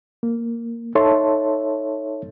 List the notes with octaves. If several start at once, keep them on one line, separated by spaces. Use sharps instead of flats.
A#3
D#4 A4 C#5 E5 A5 C6